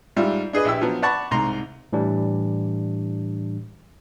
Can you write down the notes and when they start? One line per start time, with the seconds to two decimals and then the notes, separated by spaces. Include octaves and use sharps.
0.16 G#2 G3 F4 E5
0.53 D4 G#4 B4 D#5
0.65 A#1 E4 G4 E6
0.81 F3 F#3 B3
1.02 D5 F#5 A5 B5 C#6
1.31 C2 G#2 A#5 C6
1.93 A2 E3 G3 D4